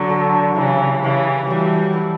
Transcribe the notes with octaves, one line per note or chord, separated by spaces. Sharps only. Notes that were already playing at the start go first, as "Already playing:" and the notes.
Already playing: D3 F#3
D4 F#4 A4
C#3 E3 E4 G4 C#5
C#3 E3 E4 G4 C#5
E3 F#3 G3 A3 E4 B4
F#3 A3 E4 B4